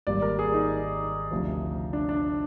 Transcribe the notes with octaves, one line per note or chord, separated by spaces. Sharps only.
G#1 G#2 G3 A#3 D5
A#4
G#4
D#4
D2 C3 F3
D4
D4